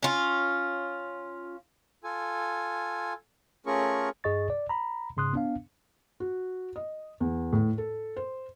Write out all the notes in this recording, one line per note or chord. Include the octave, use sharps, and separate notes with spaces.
C#4 F4
F4 A4 G#5
A3 C#4 F4 G#4 A#4 C#6
G2 G#4 D#5 C#6 A6
D5
A#5 B5
G#2 C#3 C6 D#6 F#6
B3 D4 F5
F#4
D#5
E2
A2
A4
C5